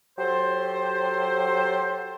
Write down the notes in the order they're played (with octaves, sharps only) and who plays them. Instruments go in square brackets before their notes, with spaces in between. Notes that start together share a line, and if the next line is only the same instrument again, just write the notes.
[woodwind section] F#3 G4 A4 C5